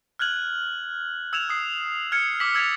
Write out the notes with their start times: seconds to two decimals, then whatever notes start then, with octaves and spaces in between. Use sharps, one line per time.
0.19 F6 F#6 G#6 F#7
1.33 E6 G#6 E7 F7
1.49 D#6 C7
2.12 F6 G#6 C#7
2.40 D6 E6 B6 F#7
2.54 E6 G#6 A6 B6 F7